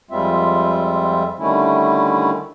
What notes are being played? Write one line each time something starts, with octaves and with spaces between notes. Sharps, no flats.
F2 G3 G#3 C4 F4 E5
D3 D#3 G3 A3 C#4 E4